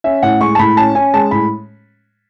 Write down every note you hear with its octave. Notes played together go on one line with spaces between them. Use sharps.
C#4 E5
A2 F#5
G#3 C#6
A5
A2 B5
C#4 A5
C#4 G#5
G#3 A5
A2 B5